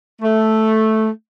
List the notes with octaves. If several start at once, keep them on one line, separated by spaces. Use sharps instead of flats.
A3